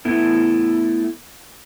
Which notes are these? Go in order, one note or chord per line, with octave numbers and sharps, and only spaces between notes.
A3 B3 E4 A4